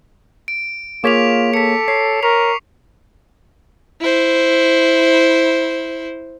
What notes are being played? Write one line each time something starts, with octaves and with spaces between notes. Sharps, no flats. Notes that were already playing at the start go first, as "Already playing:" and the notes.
D7
A#3 F4 G#4 C#5 D6 B6 F7
A4 B6 C#7
C#5 C7
A#4 C#6 B6 F7
E4 C5